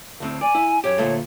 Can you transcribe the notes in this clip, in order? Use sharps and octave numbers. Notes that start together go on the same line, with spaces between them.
D2 A2 C4
D5 G#5
E4
F#2 G4 C#5
D2 A#2 A3